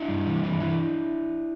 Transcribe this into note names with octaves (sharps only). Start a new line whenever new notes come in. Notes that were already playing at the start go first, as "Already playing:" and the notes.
Already playing: D4 E4
G2
E3
E3
E3